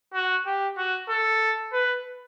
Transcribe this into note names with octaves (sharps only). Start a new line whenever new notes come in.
F#4
G4
F#4
A4
B4